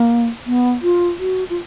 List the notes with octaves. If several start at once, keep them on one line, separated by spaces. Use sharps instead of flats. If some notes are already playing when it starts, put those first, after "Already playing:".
Already playing: A#3
B3
F4
F#4
F4